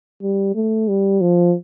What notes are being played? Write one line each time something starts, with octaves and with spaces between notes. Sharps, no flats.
G3
A3
G3
F3